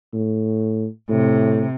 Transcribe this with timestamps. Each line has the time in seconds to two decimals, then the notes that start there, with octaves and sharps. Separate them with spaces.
0.13 A2
1.09 A2 C3